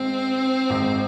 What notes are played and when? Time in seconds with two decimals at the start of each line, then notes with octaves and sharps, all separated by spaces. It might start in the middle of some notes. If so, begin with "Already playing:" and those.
Already playing: G#1 G#2 C4
0.70 G#1 G#2